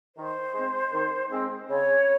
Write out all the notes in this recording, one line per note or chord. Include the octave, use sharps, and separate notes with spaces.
D#3 C5
G#3 C4
D#3
G#3 C4
C#3 C#5